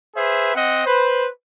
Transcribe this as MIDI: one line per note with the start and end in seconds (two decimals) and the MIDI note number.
0.16 0.52 68
0.16 0.52 71
0.16 0.52 72
0.16 0.52 76
0.55 0.85 60
0.55 0.85 75
0.55 0.85 78
0.86 1.27 71
0.86 1.27 72